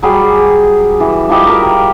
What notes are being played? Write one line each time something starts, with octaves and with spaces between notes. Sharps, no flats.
F#3 G3 G#4
E3
F3 G3 G4 D#5
A#4 E5 A#5